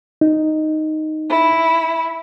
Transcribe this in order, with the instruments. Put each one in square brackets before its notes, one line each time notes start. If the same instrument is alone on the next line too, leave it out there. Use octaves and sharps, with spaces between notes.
[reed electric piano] D#4
[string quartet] E4